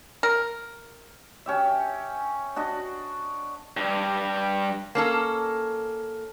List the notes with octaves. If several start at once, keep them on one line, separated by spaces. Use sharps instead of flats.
A#4
C#4 G4 E5
D4 F#4 D#5
G2 G3
A#3 C#4 A4